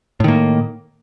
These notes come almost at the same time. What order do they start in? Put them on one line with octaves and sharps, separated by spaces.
A2 D#3 A#3